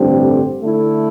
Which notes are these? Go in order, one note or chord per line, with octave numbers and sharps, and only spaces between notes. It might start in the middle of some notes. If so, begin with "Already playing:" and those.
Already playing: A1 G2 D3 G3 C4
D3 A3 E4